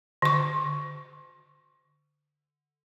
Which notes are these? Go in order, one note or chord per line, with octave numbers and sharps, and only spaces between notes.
D3 C#6